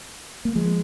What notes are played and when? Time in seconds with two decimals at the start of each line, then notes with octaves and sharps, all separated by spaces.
0.45 A#3
0.55 F3 G#3